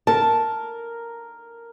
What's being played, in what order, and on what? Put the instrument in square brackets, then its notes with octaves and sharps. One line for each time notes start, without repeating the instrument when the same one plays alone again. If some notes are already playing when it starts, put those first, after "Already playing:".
[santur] A#4 [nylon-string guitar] A5